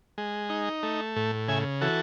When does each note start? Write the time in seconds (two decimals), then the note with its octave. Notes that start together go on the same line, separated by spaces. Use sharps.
0.18 G#3
0.49 D#4
0.83 A3
1.16 A2
1.48 C#3 E5 G#5
1.81 E3 F#4 A4